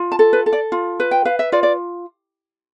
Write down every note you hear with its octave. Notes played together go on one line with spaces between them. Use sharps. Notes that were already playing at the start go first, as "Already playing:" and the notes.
Already playing: F4
A5
A4
B4
A4
D5
F4
B4
G5
B4 F5
E5
F4 D5
D5